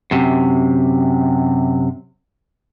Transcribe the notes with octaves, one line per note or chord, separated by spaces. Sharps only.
F#2 C3